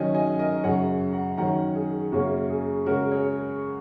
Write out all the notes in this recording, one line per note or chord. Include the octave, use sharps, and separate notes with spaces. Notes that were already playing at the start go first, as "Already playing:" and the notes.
Already playing: D#3 F#3 C#4 D#5 G#5
D#5 G#5
A#4 D#5
F#2 C#3 F#3 C#5 F#5
F#5 A#5
D#3 F#3 C#4 F#5 A#5
G#4
F#2 C#3 A#3 C#4 F#4
G#4
C#3 G#3 C#4 F#4 A#4
G#4 C#5